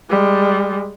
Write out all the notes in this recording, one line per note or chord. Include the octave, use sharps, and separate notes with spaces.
G3 G#3